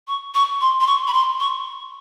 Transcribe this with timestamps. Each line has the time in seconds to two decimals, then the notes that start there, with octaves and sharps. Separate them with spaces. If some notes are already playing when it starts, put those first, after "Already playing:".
0.08 C#6
0.35 C#6
0.61 C6
0.81 C6
0.87 C#6
1.07 B5
1.13 C6
1.40 C#6